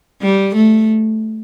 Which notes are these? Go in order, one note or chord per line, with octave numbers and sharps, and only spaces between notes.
G3
A3